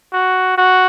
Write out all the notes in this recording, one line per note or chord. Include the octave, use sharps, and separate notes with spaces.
F#4
F#4